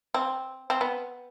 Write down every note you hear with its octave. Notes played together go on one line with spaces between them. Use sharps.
C4
C4
B3